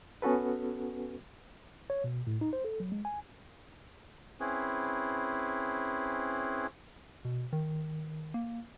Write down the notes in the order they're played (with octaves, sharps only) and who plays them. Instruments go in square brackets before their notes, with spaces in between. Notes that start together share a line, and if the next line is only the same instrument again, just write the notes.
[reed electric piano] B3 C#4 F#4 A4 B4
[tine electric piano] C#5
B2
A2
D#4
C5
A4
F#3
G#3
G#5
[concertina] C4 C#4 E4 G#4 B4
[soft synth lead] B2
D#3
A#3